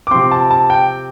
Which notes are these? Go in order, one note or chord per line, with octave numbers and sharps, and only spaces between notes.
D6
C3 F3 C4 C6
A5
A5
G5